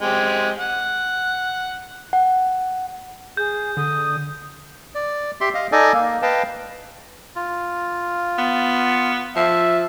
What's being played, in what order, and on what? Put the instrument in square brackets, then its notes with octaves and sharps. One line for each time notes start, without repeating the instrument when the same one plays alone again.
[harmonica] G#3 C4 G4
F#5
[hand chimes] F#5
[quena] G#4 [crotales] G6
[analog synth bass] D3 [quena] D#6
[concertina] D5
G4 E5 C6
D#5 F5
D#4 A4 D5 D#5 G#5
A#3
B4 D#5 F5 G5 A5
[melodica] F4
[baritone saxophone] B3
[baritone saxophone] F3 [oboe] E5